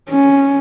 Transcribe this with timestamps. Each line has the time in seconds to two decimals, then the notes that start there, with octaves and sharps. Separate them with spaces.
0.10 C#4